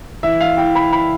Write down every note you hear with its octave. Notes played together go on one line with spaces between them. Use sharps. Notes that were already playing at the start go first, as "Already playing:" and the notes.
E3 E5
F5
E4 G5
B5
B5